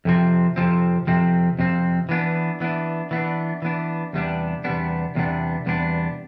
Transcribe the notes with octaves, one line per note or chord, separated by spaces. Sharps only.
F2 C3 F3 C4
F2 C3 F3 C4
F2 C3 F3 C4
F2 C3 F3 C4
E3 B3 D4
E3 B3 D4
E3 B3 D4
E3 B3 D4
E2 C3 G3 B3 D4
E2 C3 G3 B3 D4
E2 C3 G3 B3 D4
E2 C3 G3 B3 D4